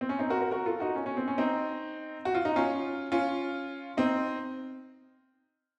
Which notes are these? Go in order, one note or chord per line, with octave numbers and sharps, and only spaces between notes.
C4
C#4
C4 D#4
F#4 A#4
F#4 A#4
F#4 A#4
F4 A4
D#4 F#4
C#4
C#4
C4
C#4
C4 D#4
F#4
F4
D#4
C#4 F4
C#4 F4
C4 D#4